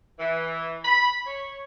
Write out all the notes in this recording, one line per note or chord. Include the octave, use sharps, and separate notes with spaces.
E3
B5
C#5